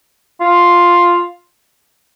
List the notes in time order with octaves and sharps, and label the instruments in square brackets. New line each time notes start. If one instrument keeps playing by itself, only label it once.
[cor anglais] F4